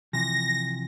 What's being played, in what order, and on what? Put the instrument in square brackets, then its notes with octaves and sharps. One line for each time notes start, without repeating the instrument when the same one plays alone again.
[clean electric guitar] C3 E3 F3 [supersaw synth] A#6